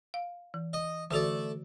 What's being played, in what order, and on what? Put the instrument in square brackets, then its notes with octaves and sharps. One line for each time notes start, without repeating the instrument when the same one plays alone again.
[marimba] F5
E3
[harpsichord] D#5
[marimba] D3 E3 F#4 [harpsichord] A3 A4 D5